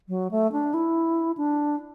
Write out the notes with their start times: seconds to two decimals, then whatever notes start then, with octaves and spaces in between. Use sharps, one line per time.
0.09 F#3
0.31 A3
0.52 D4
0.74 E4
1.37 D4